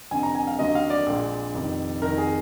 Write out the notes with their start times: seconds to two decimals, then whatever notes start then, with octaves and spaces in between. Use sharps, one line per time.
0.11 F1 F2 D3 G#5
0.23 A#5
0.35 G#5
0.47 F5
0.59 D#2 D3 F#3 A#3 D#5
0.75 F5
0.90 D5
1.07 A#1 A#2 G#3
1.55 F1 F2 D#3
2.02 F1 F2 D#3 A#4
2.18 G#4